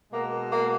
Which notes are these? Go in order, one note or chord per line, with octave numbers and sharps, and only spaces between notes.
B2 G#3 A#3
A#3